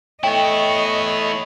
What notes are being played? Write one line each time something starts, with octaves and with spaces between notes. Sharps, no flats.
A3 B3 E4 C#5 D#5 G5